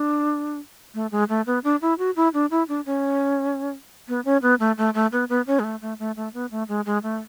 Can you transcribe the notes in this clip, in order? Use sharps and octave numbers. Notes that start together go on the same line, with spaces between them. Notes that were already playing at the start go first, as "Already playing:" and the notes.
Already playing: D4
A3
G#3
A3
B3
D4
E4
F#4
E4
D4
E4
D4
C#4
B3
C#4
B3
A3
A3
A3
B3
B3
C#4
G#3
A3
A3
A3
A3
B3
A3
G#3
G#3
A3